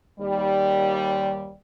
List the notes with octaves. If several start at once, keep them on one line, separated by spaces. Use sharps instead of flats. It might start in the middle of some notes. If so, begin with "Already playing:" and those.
D#2 G3